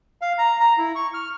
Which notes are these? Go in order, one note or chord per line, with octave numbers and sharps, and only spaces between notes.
F5
A#5
A#5
E4
C#6
F6